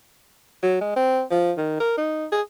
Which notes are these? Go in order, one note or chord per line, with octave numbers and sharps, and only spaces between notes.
F#3
G#3
C4
F3
D#3
A#4
D#4
G#4